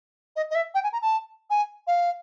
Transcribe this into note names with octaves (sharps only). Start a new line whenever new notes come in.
D#5
D#5
E5
G5
G#5
A#5
A5
G#5
F5